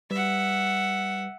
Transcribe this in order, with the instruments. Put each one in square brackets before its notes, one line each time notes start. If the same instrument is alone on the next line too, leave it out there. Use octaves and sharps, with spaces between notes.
[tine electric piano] G3 B4 [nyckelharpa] E5 F#5